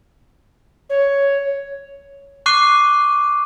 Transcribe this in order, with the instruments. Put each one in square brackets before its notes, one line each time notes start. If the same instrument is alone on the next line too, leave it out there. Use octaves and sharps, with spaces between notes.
[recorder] C#5
[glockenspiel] C#6 D6 F#6 C7 D#7